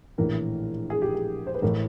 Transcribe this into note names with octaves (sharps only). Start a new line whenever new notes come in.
A#1 A2 E3 A#4
G#4
G4
G#4
C5
B4
A1 A2 E3 A#4